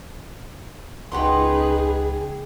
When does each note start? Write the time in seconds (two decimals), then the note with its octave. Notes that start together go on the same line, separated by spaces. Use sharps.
1.12 C#2 D#4 G4 G#4 B4 F#5 C6